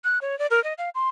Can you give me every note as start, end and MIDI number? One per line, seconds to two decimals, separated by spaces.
0.04 0.19 90
0.22 0.38 73
0.39 0.47 74
0.51 0.63 70
0.64 0.73 75
0.78 0.89 77
0.95 1.09 84